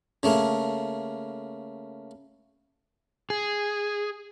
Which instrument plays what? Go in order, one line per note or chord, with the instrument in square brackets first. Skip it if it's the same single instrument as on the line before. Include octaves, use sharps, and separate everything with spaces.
[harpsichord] C#3 A3 A#3
[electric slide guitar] G#4